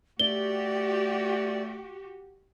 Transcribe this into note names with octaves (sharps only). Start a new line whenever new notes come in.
A3 F#4 G4 D5 G7